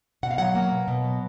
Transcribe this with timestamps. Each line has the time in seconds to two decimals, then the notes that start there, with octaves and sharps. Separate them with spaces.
0.23 B2 F#5
0.31 F5
0.38 F#3 F#5
0.55 A#3
0.72 B2
0.88 B2
1.04 F#3